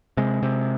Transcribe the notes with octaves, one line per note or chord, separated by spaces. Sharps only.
C3 G#3
C3